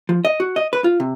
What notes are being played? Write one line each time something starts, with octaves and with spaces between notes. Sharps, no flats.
F3
D#5
F#4
D#5
B4
F4
C3